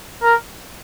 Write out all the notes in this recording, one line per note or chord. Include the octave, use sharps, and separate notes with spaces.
A#4